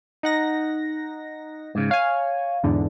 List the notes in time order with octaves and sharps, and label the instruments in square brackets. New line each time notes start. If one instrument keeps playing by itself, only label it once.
[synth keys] D#4 F#5 A#6
[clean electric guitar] G#2 C#3
[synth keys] C#5 G#5 [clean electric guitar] F5
[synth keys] E2 G#2 D3